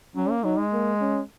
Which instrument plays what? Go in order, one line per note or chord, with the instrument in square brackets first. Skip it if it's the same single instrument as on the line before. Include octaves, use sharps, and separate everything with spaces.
[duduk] F#3 [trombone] C#4
[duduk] A#3
[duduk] F#3 [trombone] D#4
[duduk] G#3
[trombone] A#3
C#4